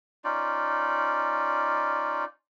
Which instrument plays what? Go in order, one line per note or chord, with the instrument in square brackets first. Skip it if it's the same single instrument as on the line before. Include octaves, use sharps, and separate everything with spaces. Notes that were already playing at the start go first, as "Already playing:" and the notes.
[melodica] C#4 D#4 F4 D5